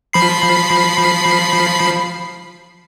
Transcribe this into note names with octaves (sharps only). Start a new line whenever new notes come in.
F3 B5 C7